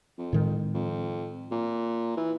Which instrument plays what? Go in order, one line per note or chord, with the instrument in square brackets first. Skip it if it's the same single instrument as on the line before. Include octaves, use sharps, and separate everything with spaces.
[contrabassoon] F2
[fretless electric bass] A2 D#3 G#3
[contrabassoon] F2
A#2
E3